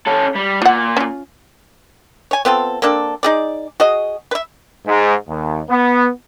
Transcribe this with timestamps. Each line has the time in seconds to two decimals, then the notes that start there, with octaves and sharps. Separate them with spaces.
0.07 C#4 A4
0.35 G3
0.62 A#2 F4 F#5
0.97 C#4 F4
2.31 C#5 G#5
2.45 B3 C4 F4 A4
2.82 A#3 C4 D4 A4
3.23 D#4 G#4 D5
3.80 F#4 G#4 D#5
4.31 B4 E5
4.86 G#2
5.28 D#2
5.69 B3